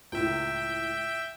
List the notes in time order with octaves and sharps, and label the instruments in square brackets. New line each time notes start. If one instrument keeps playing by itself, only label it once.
[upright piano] C#2 A2 [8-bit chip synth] E5 G5